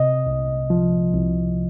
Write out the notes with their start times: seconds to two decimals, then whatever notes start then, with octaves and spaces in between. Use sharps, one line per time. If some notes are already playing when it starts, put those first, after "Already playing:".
Already playing: C3 D#5
0.27 C2
0.70 F3
1.13 C2